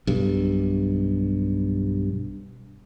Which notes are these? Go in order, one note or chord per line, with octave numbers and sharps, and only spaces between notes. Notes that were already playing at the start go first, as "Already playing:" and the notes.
B1 G2